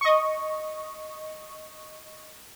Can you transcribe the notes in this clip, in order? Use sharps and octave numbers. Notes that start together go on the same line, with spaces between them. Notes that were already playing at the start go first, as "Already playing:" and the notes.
D#5 C#6